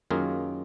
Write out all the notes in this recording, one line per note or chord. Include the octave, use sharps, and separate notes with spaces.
F#2 D#3 A#3 F4 G#4